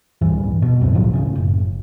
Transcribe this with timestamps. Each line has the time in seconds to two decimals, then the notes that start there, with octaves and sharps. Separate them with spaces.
0.21 D1 G2 E3
0.62 B2
0.81 C#2 F#2 C3
0.93 F#1 A2 F3 F#3
1.14 A2 C#3
1.36 F#1